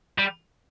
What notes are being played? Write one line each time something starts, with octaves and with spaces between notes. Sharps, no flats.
G3